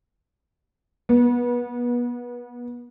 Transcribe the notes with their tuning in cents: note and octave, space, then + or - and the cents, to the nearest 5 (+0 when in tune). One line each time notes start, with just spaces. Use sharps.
B3 -25